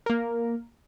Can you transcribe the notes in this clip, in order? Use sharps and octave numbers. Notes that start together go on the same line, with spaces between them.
A#3 A#4